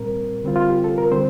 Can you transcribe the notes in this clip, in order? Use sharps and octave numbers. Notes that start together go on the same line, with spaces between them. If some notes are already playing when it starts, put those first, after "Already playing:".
Already playing: A#2 G3 C4 A#4
D3 G3 C4 F4
F4
G4
A4
A#4
D3 G3 C4 C5